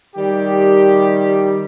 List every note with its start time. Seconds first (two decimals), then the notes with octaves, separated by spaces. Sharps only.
0.15 D#3 G3 G4